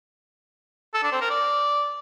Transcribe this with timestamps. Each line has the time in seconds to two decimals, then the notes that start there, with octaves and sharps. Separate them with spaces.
0.94 A4
1.03 D4
1.12 C4
1.21 A#4
1.30 D5